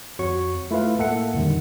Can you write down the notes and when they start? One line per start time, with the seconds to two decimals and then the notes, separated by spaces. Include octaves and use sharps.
0.19 F2 F#4 C#5 C#6
0.71 A3 E4 F4 B4 F5
0.98 A2 A#3 A4 E5 F#5 C#7
1.34 F2 A#2 D3 D#3 G3